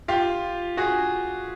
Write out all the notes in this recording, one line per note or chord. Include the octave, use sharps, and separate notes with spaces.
F4 G4
F#4 G#4